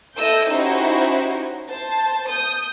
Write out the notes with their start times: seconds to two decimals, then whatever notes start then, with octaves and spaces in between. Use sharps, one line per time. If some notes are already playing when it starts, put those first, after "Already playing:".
0.16 E4 A4 D#5 E6 G6
0.51 C#4 D#4 E4 F#4 G4 C5
1.68 C5 A5
2.28 D#6 G6